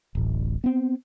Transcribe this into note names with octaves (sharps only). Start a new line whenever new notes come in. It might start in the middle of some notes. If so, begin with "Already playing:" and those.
D1 A1
B3 C4